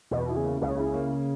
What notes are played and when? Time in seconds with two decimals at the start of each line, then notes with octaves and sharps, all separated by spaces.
0.11 E2 B2
0.29 E4
0.36 C#3
0.44 A#3
0.61 C#2 C#3
0.78 E4
0.94 A#3